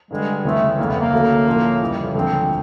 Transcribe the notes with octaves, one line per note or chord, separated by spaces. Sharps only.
G2 D3 G3 G#3
D2 C#3 E3 G#3 A3 C4
F1 F2 C#3 A#3
B3
A#3
D2 C#3 F#3 A3
A2 F3 A3 C#4 F4
F2 C#3 E3 G3
E1 D2 D3 F3 G#3 C4